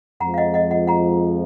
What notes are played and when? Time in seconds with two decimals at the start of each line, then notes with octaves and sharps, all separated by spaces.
0.20 F2 F3 G#3 F#5 A#5
0.34 F5
0.38 D#5 F#5
0.54 D#5 F#5
0.71 D#5 F#5
0.87 F#5 A#5